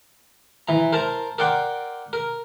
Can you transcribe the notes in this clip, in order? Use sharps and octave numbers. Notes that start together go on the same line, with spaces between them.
E3 A#5
A#4 C5 A5 A#5
A#4 D5 F#5 G5 C6
A#4